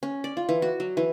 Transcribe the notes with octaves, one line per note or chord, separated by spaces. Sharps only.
C#4
D5
F4
E3
F#4
F#3
E3